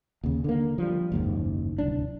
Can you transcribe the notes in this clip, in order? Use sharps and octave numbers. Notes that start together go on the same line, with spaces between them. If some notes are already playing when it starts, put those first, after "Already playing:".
D#2 C#3
D3 A#3
F3 G3
F#1 D#2 G#2
D1 C2 D4